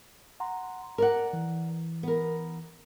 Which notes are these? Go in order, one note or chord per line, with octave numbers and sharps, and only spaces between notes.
F#5 A#5 C6
A#4 D5 F#5 A#5
E3
B3 A#4